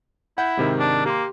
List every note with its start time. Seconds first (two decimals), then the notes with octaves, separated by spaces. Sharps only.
0.38 E4 F#5 G6
0.57 G#2 C3 D#3
0.80 D4
1.06 A#3 G4 C6